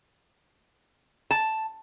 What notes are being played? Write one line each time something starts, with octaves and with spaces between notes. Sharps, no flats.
A5